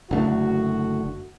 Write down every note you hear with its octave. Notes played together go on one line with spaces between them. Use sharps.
F#1 D3 A3 F#4